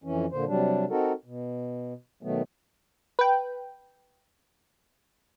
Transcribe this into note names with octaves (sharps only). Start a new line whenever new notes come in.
F2 E3 C#4
A#2 D3 C5
C3 F#3 G3 D4
C4 D#4 F#4 A4 A#4
B2
B2 D#3 F#3 A3 B3
B4 G5